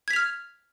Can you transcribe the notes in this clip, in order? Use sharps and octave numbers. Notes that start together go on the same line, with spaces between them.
F6 G#6 B6 F7